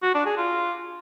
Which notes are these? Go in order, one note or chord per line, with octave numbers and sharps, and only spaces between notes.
F#4
D4
G#4
F4